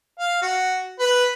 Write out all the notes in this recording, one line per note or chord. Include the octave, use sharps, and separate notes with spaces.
F5
F#4
B4